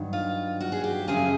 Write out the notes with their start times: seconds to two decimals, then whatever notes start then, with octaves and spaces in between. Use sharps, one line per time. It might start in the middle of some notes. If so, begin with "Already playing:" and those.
Already playing: G2 D#3 F#3
0.13 F4
0.60 F#4
0.72 G#4
0.84 G4
1.08 F#2 C#3 F3 G#4